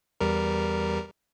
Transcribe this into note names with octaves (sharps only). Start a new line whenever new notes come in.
E2 G3 A#4